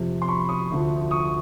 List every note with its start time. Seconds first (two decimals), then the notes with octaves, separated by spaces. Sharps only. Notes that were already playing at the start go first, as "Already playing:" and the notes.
Already playing: F2 C3 F3
0.22 C6
0.28 B5 C#6
0.48 C#6 D#6
0.70 D2 D3 F3
1.11 C#6 D#6